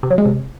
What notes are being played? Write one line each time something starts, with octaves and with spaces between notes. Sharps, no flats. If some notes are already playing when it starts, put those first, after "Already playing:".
C3
F#3
G#3
C3